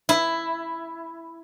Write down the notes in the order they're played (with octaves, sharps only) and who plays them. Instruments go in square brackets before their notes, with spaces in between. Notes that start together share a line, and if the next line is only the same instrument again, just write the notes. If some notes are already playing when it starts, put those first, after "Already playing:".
[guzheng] E4